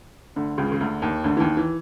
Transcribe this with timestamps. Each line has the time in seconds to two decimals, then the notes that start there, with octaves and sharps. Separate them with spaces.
0.36 D2 D3
0.58 C#2 C#3
0.72 C#3
0.81 D2 D3
1.02 D#2 D#3
1.24 D2 D3
1.37 E3
1.40 D#2 D#3
1.57 E3